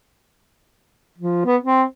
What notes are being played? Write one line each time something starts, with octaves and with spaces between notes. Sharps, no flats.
F3
B3
C4